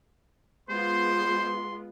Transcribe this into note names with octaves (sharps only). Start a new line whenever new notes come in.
G#3 B3 F4 C5 C6